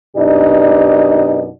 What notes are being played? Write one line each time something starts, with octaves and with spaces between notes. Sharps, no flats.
F#2 B2 D4 D#4 G4 D5